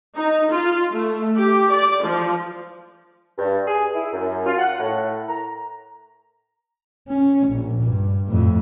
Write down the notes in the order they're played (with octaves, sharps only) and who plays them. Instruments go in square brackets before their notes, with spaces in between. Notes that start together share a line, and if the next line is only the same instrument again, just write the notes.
[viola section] D#4
F4
A3
G4
D5
F3
[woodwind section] G2
G#4
E4
F#2
F4
F#5
A2
A#5
[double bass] C#4
A#1
G2
F2 A2